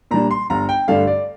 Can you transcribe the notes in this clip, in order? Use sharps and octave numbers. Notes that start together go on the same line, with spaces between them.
A#2 G3 D4 A#5
C6
G1 A#5
G5
G2 D3 A3 D4 F5
D5